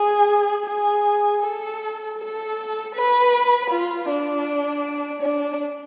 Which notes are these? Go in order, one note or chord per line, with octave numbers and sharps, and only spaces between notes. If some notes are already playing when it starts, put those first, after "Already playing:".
Already playing: G#4
G#4
A4
A4
B4
F4
D4
D4